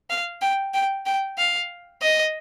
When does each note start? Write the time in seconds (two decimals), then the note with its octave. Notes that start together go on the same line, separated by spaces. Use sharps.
0.10 F5
0.42 G5
0.74 G5
1.06 G5
1.38 F5
2.02 D#5